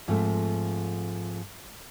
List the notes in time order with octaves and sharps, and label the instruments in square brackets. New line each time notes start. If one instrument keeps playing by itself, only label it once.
[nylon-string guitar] G#2 F3 A3 C4